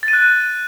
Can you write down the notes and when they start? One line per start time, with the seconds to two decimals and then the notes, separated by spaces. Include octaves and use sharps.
0.03 A6
0.08 D#7
0.13 F#6